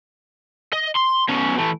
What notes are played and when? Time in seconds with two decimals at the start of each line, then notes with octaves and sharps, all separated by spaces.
0.73 D#5
0.95 C6
1.28 B2 C#4
1.58 E3 A3